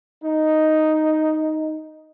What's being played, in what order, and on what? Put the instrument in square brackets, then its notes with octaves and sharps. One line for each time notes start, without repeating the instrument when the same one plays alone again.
[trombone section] D#4